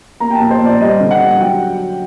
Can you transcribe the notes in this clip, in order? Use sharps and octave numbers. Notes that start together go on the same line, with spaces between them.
A#3 A#5
G5
A5
A#2
C5
A#2 D5
G3 D#5
D3
F#5
G3
F#3 G5